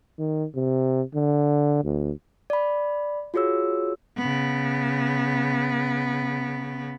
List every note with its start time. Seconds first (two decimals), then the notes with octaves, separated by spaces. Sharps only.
0.19 D#3
0.55 C3
1.14 D3
1.84 D2
2.50 D5 B5
3.34 F4 F#4 G#4 C#5 E6
4.17 C#3 B3